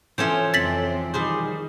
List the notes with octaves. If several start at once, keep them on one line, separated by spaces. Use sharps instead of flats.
E3 F3 C#4 A4 C5
F2 C3 C4 A6 B6 F#7
D#3 G3 G#4 C5